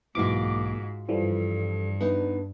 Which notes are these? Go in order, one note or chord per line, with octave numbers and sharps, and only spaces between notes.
B1 G#2 E3 A#3 F4 F#4 D6
G2 E3 F3 G3 A4
B3 D4 D#4